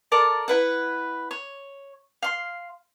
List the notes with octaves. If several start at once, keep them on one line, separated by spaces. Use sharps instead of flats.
A4 A#4 D5 A5
E4 B4 F#5
C#5
F5 C6